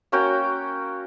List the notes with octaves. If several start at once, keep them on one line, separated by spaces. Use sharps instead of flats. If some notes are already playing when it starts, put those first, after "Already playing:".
A#3 C#4 F#4 G5